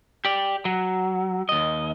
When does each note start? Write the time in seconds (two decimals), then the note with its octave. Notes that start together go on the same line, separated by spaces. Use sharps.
0.25 G4 D5
0.65 F#3
1.49 D#2 D#5